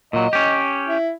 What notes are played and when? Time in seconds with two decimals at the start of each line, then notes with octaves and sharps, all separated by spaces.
0.13 A#2 F#3 D#5
0.33 C#4 G4
0.87 E4